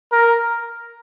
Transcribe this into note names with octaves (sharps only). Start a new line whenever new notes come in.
A#4